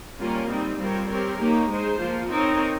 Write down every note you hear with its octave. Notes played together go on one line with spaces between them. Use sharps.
G3 A#3 C#4 F4 A#4
G3 C4 D#4
G3 C4 F4 A#4 C#5
C4 G4 A#4 C#5
A#3 D#4 G4 C#5
G#3 D#4 G#4 C5
F3 A#3 F4
C4 D#4 A#4 C#5